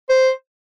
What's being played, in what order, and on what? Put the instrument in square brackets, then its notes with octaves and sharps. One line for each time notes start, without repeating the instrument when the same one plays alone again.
[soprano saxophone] C5